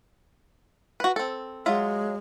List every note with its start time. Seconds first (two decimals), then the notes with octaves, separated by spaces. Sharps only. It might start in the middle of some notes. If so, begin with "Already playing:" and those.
1.00 F#4 B4
1.16 C4 A4
1.66 F#3 G#3 F4 E5